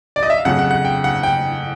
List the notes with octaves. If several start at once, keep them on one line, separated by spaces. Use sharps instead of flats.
D5
D#5
E5
F5
F2 C#3 F#3 F#5
F#5
F#5
G5
F#5
G5